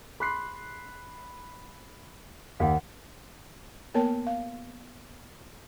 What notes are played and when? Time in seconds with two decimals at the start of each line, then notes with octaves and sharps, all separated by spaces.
0.20 G#4 B5 C6 F#6 C7
2.60 D#2 F5 F#5
3.94 A#3 B3 A#4 C#5 G5 A5
4.27 F5